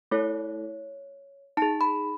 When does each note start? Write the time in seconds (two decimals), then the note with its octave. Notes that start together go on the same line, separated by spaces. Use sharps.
0.11 A3 E4 A4 C#5
1.57 D#4 G#4 A5
1.81 B5